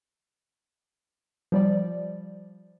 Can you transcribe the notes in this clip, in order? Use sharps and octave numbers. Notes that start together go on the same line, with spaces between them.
F3 G3 D5